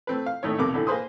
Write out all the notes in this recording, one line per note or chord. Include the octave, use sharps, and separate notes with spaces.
A3 C4 B4
F5
G#1 A2 A3 D#4 C#5
B1 F2 C3 A#4 D6
A2 D3 E3
A#3 G#4 B4 C5 C6 D#6